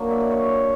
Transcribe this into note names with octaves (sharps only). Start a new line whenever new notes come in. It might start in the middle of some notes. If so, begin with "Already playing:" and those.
Already playing: A#2 F#3 A#3 D4
E5
D5
C#5